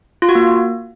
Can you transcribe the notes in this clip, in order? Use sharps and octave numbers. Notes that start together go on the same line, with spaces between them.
F4
F#4
A#3